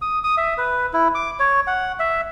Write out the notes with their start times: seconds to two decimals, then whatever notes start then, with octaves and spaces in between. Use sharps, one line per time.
0.02 D#6
0.24 D#6
0.37 E5
0.58 B4
0.93 E4
1.15 D6
1.39 C#5
1.67 F#5
1.99 E5